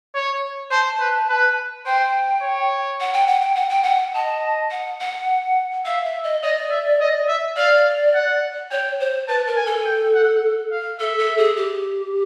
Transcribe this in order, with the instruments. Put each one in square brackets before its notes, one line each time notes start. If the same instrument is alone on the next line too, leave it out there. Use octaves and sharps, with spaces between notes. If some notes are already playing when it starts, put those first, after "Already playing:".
[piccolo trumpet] C#5
[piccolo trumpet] C5 [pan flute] A5
[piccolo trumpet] B4
B4
[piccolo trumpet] C5 [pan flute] G5
[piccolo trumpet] C#5
[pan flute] F#5
G5
F#5
G5
F#5
G5
F#5
[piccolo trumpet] D#5 [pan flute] A5
[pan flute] F#5
F#5
[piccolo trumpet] E5 [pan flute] F5
[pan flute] E5
D#5
[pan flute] D5 [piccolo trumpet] D#5
[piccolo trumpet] E5
D#5
E5
[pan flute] D5 [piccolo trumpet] F5
[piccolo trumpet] F#5
[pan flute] C#5 [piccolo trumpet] G5
[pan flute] C5
[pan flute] B4 [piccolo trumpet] A5
[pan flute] A#4
[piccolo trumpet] G#5
[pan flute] A4
[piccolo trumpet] G5
F#5
F5
[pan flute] A4 [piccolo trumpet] E5
[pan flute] A4
G#4
G4